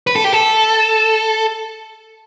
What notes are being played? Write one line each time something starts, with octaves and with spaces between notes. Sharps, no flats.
B4
A4
G4
A4